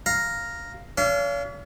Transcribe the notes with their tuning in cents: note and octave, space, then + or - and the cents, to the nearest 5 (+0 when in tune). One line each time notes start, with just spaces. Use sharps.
F5 +0 A#5 +0
C#4 +45 F5 -30